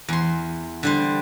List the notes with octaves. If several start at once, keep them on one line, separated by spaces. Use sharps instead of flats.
E2 C6
D3 G3 C5